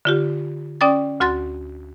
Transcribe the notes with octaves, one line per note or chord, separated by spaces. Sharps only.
D3 F4 G4
C#4 D5 G5 D6 D#6 A6
D2 F#4 C6 A6